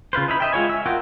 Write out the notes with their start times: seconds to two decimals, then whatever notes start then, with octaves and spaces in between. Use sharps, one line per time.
0.13 C#3 F4 B4 C5
0.28 D#4 E4 B5
0.40 D#5 E5 G5
0.52 G#3 F4 C#5 G#5
0.69 E5
0.86 F4 F#4 A#4 F#5 G5